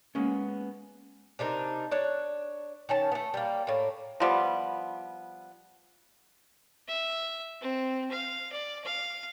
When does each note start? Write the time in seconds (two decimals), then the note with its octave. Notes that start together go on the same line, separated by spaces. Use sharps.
0.15 G#3 A#3 B3 C#4
1.39 C3 D4 D#4 A#4
1.91 D4 C#5
2.89 D#3 C#4 A5
3.12 A3 B3
3.34 G3 A#3
3.67 A2 A#3
4.20 F3 G3 B3
6.88 E5
7.61 C4
8.11 F5
8.52 D5
8.84 F5